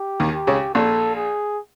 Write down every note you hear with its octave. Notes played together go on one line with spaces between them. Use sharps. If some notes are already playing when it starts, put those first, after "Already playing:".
Already playing: G4
D#2 D#3
G4
C#2 C#3
A#1 A#2 A4
G#4